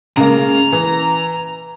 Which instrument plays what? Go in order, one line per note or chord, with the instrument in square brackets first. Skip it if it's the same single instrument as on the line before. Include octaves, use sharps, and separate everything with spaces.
[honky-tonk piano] C#3 G#3 A#3 [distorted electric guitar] A#5
[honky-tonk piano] E3